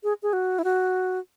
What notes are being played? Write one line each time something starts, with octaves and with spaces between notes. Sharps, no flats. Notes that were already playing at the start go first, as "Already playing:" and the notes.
G#4
G#4
F#4
E4
F#4